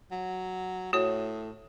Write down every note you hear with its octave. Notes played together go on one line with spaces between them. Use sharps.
F#3
A2 F#4 C#5